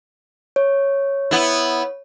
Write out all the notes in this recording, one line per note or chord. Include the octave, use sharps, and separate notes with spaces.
C#5
B3 E4